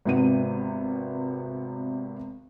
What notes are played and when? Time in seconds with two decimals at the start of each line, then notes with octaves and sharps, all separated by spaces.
0.05 G#1 C3 B3 C4 D#7